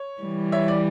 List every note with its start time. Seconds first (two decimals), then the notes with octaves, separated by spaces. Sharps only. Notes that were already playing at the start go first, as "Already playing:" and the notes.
Already playing: C#5
0.22 E3 G3
0.52 C#5 E5
0.68 D5